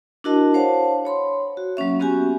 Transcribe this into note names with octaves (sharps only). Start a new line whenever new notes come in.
D4 E4 F#4 A#4 D#5 A5
C5 C#5 F5 F#5 A5
C#5 B5 C6
F#4
F#3 A#3 C#4 E5
B3 C#4 F#4 G4 G#5